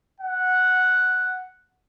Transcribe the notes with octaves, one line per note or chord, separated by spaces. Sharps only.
F#5